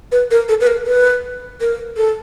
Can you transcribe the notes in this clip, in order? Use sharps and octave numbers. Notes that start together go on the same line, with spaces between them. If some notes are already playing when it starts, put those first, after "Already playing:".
B4
A#4
A4
B4
A#4
B4
A#4
A4